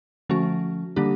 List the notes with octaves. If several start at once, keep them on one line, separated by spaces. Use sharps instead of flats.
D3 F3 A3 C#4 F#4
D3 G3 A#3 D4 G4